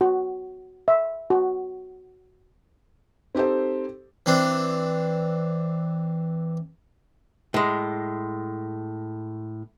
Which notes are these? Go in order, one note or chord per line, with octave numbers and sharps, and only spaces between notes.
F#4
E5
F#4
C4 D#4 G4 A4 C5
E3 C4 D4
A2 G#3